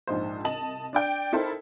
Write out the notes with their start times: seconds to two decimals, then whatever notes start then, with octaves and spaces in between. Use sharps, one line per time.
0.07 A#1 G#2 D#4 C5
0.44 C2 D#5 A5 F#7
0.93 D4 D5 G5
1.32 D#4 E4 A4 A#4 C5